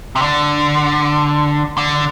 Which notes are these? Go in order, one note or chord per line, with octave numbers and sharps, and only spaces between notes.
C3
D3
D3